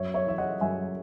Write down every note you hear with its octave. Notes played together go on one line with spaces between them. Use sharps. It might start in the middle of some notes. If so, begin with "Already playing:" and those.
Already playing: F#2 C#5 E5
C#5 E5
E3 E5
D#5 F#5
F#2 E5 G#5